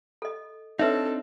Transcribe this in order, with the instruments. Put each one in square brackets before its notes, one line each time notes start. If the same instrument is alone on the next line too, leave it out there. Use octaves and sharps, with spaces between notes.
[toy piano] A4 D#5
[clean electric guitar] C4 D4 D#4 [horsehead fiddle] A4 [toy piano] B4 C#5 E5